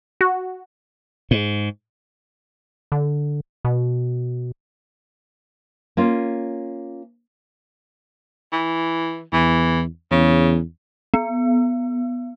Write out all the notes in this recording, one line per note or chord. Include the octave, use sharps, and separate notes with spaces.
F#4
G#2
D3
B2
A#3 C#4 F4
E3
E2 E3
E2 C#3
B3